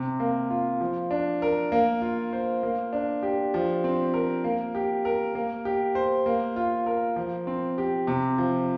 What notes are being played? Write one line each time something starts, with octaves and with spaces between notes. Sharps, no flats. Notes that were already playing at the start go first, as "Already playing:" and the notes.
Already playing: C3
A#3
F4
F3
D4
A#4
A#3
F4
C5
A#3
D4
G4
F3
C4
A#4
A#3
G4
A#4
A#3
G4
C5
A#3
F4
A#4
F3
C4
G4
C3
F3